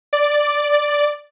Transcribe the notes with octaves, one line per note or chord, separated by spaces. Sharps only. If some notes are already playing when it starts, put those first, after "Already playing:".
D5